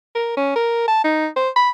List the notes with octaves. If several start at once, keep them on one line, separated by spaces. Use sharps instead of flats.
A#4
C#4
A#4
A5
D#4
C5
B5